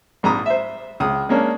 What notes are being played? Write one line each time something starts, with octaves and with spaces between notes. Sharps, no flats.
A#1 G#2 A#5 B5 D#6
C5 E5
C#2 D#6
G#3 A#3 C#4 D4